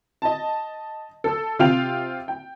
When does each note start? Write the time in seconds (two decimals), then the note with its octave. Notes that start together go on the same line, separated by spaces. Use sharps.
0.22 D#5 A5
1.24 A4 E6
1.59 C3 F4 F5 G5 F7
2.28 G5